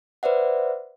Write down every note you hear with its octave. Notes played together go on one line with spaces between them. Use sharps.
B4 C5 D5 E5 F#5